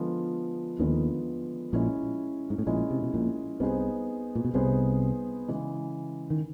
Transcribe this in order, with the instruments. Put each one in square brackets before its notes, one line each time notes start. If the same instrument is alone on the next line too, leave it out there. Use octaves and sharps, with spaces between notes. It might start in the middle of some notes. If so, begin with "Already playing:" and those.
Already playing: [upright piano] D3 F3 G#3 B3
[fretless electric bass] D#2 D#3 [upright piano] D3 F3 G#3 B3
[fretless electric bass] A#1 A#2 [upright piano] G#3 C#4 E4
[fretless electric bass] G#2
A2
[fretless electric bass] A#1 A#2 [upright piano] G#3 C#4 E4
[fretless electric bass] C3
B2
A#1 A#2
[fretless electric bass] C2 C3 [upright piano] B3 D#4 G#4 C5
[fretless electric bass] A#2
B2
[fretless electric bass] C2 C3 [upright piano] B3 D#4 G#4 C5
[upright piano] C#3 E3 G#3
[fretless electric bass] D#3